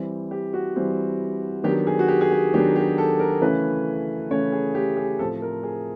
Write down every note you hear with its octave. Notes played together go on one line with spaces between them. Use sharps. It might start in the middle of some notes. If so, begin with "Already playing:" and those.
Already playing: E3 G3 C4
G4
F#4
E3 G3 C4
D#3 F#3 B3 D4 G4
G#4
F#4
G4
G#4
G4
D#3 F#3 B3 D4 G4
G4
A4
A#4
C#3 E3 A3 C#4 B4
C#3 E3 A3 C#4 C#5
G#4
G4
G#4
A2 F3 A3 C4 A4
A#4
G#4